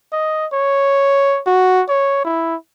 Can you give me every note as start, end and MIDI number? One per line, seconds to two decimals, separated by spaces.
0.12 0.46 75
0.53 1.40 73
1.47 1.82 66
1.89 2.20 73
2.24 2.55 64